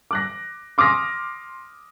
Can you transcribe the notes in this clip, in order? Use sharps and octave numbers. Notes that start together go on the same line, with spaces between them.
D6 F#6 A#6
C6 D6 D#6 F6 A#6